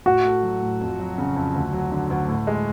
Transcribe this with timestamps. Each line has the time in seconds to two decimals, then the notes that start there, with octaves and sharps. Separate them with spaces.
0.06 A2 F#4
0.25 A3
0.43 F#3
0.62 A2
0.81 F2
0.99 F#3
1.18 C#3
1.36 F2
1.55 D2
1.73 F#3
1.92 D3
2.10 D2
2.28 A2
2.47 G#3